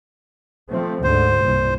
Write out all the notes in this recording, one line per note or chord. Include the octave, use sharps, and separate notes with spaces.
F3 A3 C4
D2 G#2 D3 C5
C2 G2 A#2